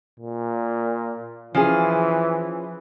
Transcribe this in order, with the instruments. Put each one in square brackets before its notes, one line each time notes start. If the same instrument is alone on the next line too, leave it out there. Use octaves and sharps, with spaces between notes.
[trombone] A#2
[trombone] E3 [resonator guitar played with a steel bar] F3 C#4 G#4